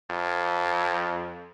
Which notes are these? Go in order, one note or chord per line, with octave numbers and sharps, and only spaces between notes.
F2